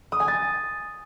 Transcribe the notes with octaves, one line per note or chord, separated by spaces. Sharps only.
D#6
G#5
A6